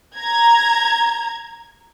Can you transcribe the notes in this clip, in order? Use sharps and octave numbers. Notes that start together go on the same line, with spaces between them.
A#5 G#6